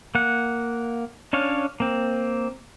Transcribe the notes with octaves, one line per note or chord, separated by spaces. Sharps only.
A#3 F#5
C#4 D4 C#5 F5
A#3 C4